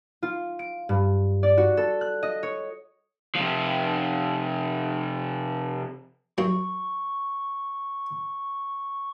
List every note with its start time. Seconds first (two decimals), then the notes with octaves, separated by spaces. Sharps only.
0.22 F4
0.59 D7
0.89 G2
1.43 D5
1.57 F#4
1.77 A4
2.01 F#6
2.23 D#5
2.43 C#5
3.35 C3 F3
6.38 F#2 F#3 C#6